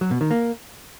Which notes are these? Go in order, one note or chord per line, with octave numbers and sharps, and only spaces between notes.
F#3
B2
D#3
A#3